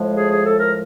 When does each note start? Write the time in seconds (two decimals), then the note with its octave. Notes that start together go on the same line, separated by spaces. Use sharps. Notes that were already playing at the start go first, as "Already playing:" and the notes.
Already playing: A2 F3 G#3
0.15 G#4
0.30 G#4
0.44 A4
0.58 A#4